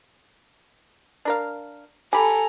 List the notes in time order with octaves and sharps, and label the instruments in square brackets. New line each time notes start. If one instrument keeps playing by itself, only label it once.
[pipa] D4 A#4 F5
[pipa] G4 B5 [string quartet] A4 A#5 [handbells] G#5